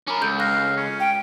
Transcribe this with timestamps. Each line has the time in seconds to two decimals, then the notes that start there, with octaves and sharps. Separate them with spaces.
0.07 C#4 A#4 B5 D6
0.21 C#2 A4 G6 F7
0.40 F5 F#6 A#6
0.77 C#4
1.00 G5